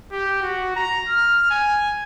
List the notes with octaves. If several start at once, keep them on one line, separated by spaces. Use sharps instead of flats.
G4
F#4
A#5
F6
G#5